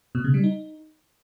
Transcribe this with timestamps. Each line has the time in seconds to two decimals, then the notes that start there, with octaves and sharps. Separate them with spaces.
0.15 B2
0.24 C#3
0.34 G3
0.44 D#4